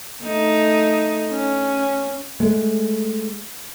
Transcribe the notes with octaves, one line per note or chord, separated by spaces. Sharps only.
A3 D#4
C#4
G#3 A3